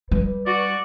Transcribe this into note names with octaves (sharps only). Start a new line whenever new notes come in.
G3 B4
F#4 D5